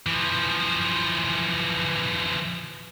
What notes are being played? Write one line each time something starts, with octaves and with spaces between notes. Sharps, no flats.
E3 F3